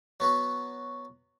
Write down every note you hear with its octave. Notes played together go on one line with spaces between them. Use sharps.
F#3 B3 F#4